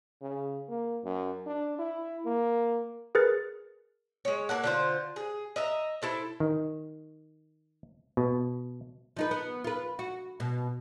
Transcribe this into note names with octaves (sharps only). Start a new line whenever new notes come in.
C#3
A#3
F#2
D4
E4
A#3
G#4 A#4 B4 A6 C#7
G#3 C#5
A#3 A4 F#5
D3 F4 C5
G#4
D#5 E5 A#5
E4 A4 C5
D#3
B2
F3 D#4 B4
B3
F4 B4
F#4
B2